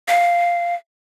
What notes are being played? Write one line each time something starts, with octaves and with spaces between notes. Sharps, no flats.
F5